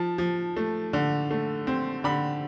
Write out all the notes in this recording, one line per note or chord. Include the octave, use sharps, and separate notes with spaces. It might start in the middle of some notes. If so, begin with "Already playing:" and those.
Already playing: F3 A5
F3
A3
D3
A3
C4
D3 B5